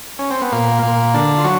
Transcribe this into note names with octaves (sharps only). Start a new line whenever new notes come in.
C#4
C4
B3
A#2 A#3
A#2 A#3
D3 D4
F4
F#3 F#4